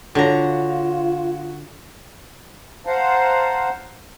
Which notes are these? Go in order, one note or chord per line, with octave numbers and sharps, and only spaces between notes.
D3 F4 F#4 C#5 A#5
C5 F5 F#5 A5 A#5